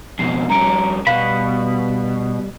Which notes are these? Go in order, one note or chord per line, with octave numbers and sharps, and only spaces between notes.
F2 B2 C7
G2 C#4 A#5 C#7 D7
B2 G3 F5 F#5 B5